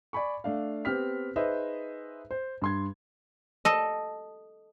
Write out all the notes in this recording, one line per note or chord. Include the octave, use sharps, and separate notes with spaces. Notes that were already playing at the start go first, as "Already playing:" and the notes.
D5 G#5 B5 C#6
A3 D4 F5
B3 C4 G4 F6 B6
D#4 G#4 B4 C5 D#5 E5
C5
G2 C6 G#6
A4 D#5